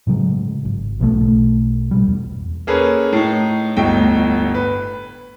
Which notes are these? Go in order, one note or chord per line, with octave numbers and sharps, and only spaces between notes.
A2 C#3 F#3 G#3
G#1
B1 B2 F#3 A3
A1 B2 G3
E2
A#3 C#4 G#4 A4 B4
A2 D#4
G1 D2 A2 D#5 G5
B4